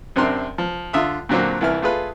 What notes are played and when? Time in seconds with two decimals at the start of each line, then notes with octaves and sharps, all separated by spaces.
0.16 F#2 C3 C4 D4 A#4 C6
0.58 F3
0.93 D3 F4 E5 D#6
1.29 A#2 D3 F#3 A#3 C4
1.61 C2 E3 E4 F6
1.82 A3 F4 G#4 B4